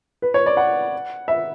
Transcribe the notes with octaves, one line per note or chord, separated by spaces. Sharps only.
B4
C#5
D5
F#5
E5